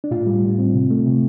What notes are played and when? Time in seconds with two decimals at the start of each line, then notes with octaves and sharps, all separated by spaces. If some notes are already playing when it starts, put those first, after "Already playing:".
0.04 D4
0.11 A2 F4
0.27 G3
0.43 A2
0.58 C4
0.74 C3
0.90 A3
1.06 C3